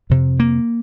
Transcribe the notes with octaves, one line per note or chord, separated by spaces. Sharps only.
F2 C3
A#3